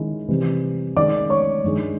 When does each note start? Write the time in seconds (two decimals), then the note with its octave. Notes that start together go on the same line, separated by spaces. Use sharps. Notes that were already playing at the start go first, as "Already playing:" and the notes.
Already playing: D#3 G#3 C#4 E4
0.28 C3 E3 G3
0.96 D#3 G#3 C#4 D5 D6
1.30 C#5 C#6
1.64 G2 D#3 G#3